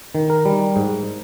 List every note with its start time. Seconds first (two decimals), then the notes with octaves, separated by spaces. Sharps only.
0.15 D#3
0.30 A#4
0.45 G3
0.76 G#2